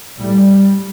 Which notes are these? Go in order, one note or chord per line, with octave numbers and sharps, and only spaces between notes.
A2 G3